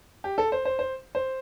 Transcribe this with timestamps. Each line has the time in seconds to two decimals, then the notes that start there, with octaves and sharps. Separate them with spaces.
0.24 G4
0.38 A4
0.52 C5
0.65 C5
0.79 C5
1.15 C5